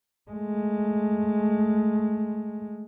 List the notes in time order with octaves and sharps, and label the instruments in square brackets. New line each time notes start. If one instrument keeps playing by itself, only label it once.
[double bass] G#3 A3